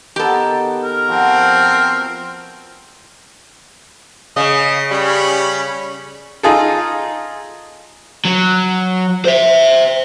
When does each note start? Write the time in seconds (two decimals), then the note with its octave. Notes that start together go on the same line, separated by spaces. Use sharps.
0.16 D#3 B3 G4 A4
0.84 A#4
1.08 F3 C4 F#4
4.36 C#3 D#5
4.91 G3 C#4 B5
6.43 D#4 F4 G#4 A4
8.25 F#3
9.25 C5 E5